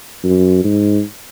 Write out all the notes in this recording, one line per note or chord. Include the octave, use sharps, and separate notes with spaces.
F#2
G#2